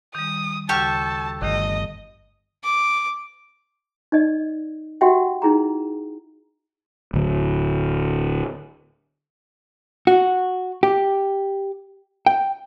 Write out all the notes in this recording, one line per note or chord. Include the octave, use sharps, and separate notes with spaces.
D#3 G3 D#6
D2 C#3 F#4 G4 A4 A5 C#6
G1 D3 D#3 A3 D#5
D6
D#4 D5 D#5
F#4 G4 E5 F#5 G5
D#4 E4 G#4 A#5
D1 D2
F#4
G4
G5